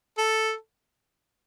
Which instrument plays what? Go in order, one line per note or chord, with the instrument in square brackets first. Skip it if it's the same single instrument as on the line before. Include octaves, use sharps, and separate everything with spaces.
[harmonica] A4